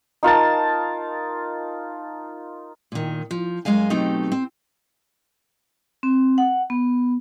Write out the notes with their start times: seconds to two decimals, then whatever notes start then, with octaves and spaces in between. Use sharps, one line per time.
0.23 D#4 F4 A#4 A5
2.92 A#2 D#3
3.31 F3
3.65 F#2 G#3 D#5 F5 G#5
3.90 B2 F#3 A3 C4 D#4 G4
4.32 C4
6.03 C4
6.38 F#5
6.70 B3